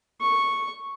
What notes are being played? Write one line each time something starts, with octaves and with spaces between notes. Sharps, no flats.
C#6